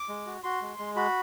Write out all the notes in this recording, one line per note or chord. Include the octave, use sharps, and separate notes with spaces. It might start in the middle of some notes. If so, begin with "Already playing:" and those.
Already playing: D6
G#3
F#4
F#4 C6
G#3
G#3
F#4 B5